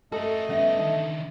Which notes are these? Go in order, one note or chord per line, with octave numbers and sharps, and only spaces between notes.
A3 F#4 A4 A#4 D#5
G3 B3 C#4 E5
D3 D#3 D#4 E5